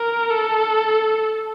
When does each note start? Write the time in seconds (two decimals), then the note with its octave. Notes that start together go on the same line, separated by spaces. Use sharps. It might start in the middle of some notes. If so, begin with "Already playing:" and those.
Already playing: A#4
0.31 A4